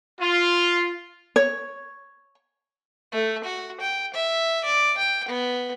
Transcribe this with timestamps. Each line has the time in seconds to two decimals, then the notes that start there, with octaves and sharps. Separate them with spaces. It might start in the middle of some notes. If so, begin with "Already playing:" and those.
0.19 F4
1.36 C#5
3.12 A3
3.44 F#4
3.80 G5
4.14 E5
4.64 D5
4.97 G5
5.28 B3